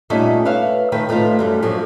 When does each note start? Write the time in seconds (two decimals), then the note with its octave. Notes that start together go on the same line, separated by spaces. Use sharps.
0.10 A#2 G3 A3 C#4 D#4 E5
0.45 B4 C#5 E5 F5
0.92 D#3 A3 B4 G5
1.09 A2 A3 C4 D#4 F4
1.39 F#2 G3 C#4
1.62 A2 F3 F#3 A3 D4